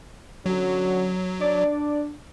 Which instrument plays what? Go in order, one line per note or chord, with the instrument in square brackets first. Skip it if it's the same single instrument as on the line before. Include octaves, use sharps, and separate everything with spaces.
[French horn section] D3 C#4 F#4 [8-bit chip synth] F#3
[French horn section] D4 [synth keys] D5